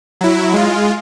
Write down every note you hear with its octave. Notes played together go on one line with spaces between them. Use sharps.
F#3 E4
G#3 F4